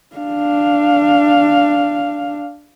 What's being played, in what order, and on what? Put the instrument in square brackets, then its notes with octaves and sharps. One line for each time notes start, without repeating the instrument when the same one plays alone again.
[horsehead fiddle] D4 F5